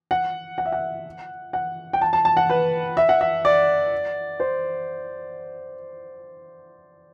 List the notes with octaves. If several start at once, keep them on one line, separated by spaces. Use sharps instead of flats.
F#5
F#5
E5
F#5
F#5
G5
A5
A5
A5
F#5
B4
E5
F#5
E5
D5
C5